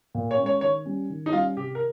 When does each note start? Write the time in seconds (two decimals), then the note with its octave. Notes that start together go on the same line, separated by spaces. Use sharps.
0.15 A#2
0.31 C#5
0.38 C#4
0.43 G#3 C#5
0.61 D#3 C#5
0.86 G3 C#4
1.10 D#3
1.26 D#4
1.32 G3 F4
1.35 C#4
1.57 C3 G4
1.75 A#4